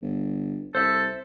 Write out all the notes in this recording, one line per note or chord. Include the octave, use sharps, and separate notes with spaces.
G1
C2 A4 C5 E5